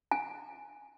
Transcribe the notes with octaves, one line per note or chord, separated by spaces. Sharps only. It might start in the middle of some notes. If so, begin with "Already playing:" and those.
G#5